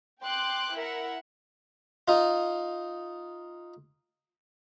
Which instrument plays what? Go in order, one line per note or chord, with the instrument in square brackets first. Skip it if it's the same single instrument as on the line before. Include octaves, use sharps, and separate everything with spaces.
[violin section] G5 C6 D6 F#6
E4 A#4 E5 F#5
[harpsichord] D#4 F4